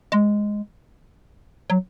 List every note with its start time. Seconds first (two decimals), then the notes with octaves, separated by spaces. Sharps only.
0.12 G#3
1.70 F#3